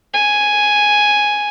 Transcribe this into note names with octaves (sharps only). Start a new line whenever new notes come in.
G#5